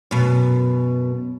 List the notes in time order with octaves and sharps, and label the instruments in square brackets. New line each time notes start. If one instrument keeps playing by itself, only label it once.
[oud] F#2 B2